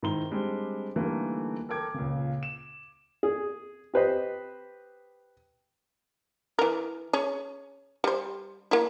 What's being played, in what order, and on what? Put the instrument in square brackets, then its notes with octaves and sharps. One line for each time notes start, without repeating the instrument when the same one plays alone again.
[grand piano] G#2 D#3 E4 A#5 C6 G7
G3 G#3 C4 D4
D3 E3 G3 A3 A#3 D#4
A4 A#4 G5 D6 G#6
C#2 A#2 C#3
E7
[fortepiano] G#4
G4 B4 C5 D#5
[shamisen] E3 A#4
C#4 G#4
G3 C5
A#3 E4